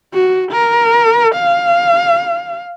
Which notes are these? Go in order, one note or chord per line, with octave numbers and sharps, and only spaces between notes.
F#4
A#4
F5